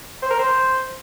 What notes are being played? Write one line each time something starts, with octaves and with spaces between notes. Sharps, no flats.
C5
A#4
C5